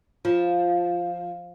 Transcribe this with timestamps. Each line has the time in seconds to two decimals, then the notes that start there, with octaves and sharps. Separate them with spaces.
0.25 F3 F4